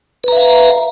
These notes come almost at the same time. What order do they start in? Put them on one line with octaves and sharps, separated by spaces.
B4 A#5 E5 F5